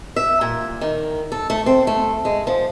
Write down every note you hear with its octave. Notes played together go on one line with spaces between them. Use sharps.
E5
A#2
D#3
A4
A3
C4
A3
G#3
F3